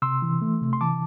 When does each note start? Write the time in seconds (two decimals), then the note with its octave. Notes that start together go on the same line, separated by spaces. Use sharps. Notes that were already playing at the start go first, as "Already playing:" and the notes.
0.02 C3 C6 E6
0.22 E3
0.42 A3
0.61 C3
0.73 C6
0.81 E3 A5 D6